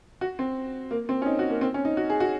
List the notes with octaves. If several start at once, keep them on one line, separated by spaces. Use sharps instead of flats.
F#4
C4
A#3
C4
C#4
D#4
F#4
A#3
C4
C#4
D#4
F#4
G#4
F#4